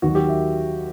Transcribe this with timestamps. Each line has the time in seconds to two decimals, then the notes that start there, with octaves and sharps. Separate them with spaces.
0.02 D#2 D#3 F#3 F#4
0.15 G4
0.29 E5